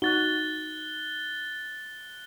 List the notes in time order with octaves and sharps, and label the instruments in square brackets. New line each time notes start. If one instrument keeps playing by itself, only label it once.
[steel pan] D#4 F#4 [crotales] F#6 A6 G7